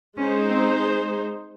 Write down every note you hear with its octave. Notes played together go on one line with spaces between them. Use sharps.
G#3 C#4 D#4 G#4 C5
C4